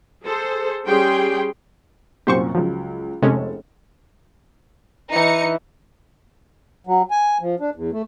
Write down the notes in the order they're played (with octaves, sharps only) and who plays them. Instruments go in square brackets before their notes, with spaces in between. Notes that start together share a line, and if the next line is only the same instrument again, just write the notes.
[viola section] G#4 A4 C5
G3 C#4 G4 G#4 G5 C6
[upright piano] C2 F#2 A#2 [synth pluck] G4 C5 C#6
[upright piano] C#2 F#3 [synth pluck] F3
[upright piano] F1 A4 [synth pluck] C3 G#3 C#4
[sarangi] E3 [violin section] D#4 C#7
[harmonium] F#3
G#5
F3
D4
E2
A3